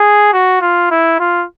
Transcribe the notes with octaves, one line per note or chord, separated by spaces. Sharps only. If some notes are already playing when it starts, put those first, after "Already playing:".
Already playing: G#4
F#4
F4
E4
F4